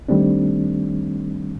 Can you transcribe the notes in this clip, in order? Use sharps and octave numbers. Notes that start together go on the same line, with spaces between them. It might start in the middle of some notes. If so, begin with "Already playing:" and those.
D#3 G3 A3 C4 D4